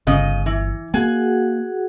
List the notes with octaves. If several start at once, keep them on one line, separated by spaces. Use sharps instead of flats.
G1 C#3 D#5
E3
A#3 F#4 G#4 F#5 G#5